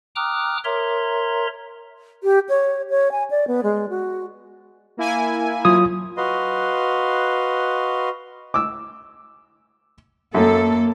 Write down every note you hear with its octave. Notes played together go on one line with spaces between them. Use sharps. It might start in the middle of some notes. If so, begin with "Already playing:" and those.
G5 A#5 D6 D#6 F6 F#6
A#4 C#5 E5 A#5 C6
G4
C#5
C#5
G#5
D5
B3
G#3
F#4
A#3 E4 G#5
F#3 F4 D#6
F#4 B4 D#5 F5 C6
D6 E6
F#2 A#3 A4